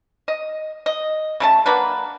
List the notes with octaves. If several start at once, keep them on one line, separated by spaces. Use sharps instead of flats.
D#5
D#5
C#3 A3 A5
F#3 A#3 D4 B4